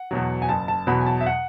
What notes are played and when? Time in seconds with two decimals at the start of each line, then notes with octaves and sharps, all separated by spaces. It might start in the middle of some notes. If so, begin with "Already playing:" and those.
Already playing: F#5
0.11 E2 B2 F#3
0.42 G#5
0.49 F#1 A5
0.68 A5
0.87 E2 B2 F#3 B5
1.01 G#5
1.06 A5
1.21 E5
1.26 F#5